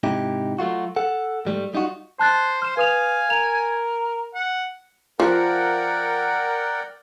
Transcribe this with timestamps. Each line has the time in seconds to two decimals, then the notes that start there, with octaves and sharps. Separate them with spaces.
0.03 G#2 C3 D#4 E4 G4
0.59 F#3 A3 F4 F#4
0.96 A4 F#5
1.45 G#2 G3 A3
1.74 G3 D#4 F4 F#4
2.19 C5 A5 F#6 A6
2.62 C5 F6 E7
2.77 B4 F5 G#5 D#6 F7
3.30 A#4 F7
4.35 F#5
5.20 F3 A#4 D5 F#5 G5